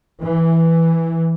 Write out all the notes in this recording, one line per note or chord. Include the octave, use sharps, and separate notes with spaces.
E3